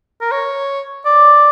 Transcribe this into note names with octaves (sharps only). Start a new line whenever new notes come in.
A#4
C#5
D5